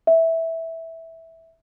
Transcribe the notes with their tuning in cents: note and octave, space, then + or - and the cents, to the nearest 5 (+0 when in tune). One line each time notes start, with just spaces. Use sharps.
E5 -10